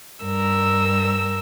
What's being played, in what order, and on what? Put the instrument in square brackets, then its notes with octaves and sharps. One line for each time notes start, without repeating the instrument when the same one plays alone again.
[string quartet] G2 A#4 E6